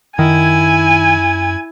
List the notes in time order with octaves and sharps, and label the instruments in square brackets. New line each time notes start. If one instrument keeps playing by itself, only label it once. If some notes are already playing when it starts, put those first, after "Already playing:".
[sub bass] F#2 [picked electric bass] D#3 [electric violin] E4 G#6 [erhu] G#5